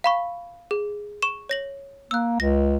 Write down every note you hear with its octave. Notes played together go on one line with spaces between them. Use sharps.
F5 B5 C#6
G#4
C#6 E7
C#5 A#6 F#7
A#3 E6 F#6
C#2 A#6